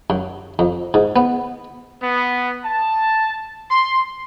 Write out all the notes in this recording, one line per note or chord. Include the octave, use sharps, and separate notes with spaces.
F#2
F2
G#2
B3
B3
A5
C6